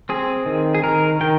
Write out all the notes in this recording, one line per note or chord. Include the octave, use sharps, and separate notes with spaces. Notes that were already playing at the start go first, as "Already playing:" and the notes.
C4 G#4
D#3
G#4
D#3 A#4
D#3 G5